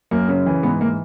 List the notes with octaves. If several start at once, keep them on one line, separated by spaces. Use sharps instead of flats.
F#2 A#3
C#3
E3
G#2 B3
E3 A#3